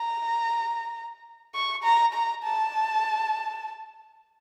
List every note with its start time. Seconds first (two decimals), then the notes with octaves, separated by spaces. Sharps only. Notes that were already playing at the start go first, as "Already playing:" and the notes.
Already playing: A#5
1.54 C#6
1.84 A#5
2.14 A#5
2.43 A5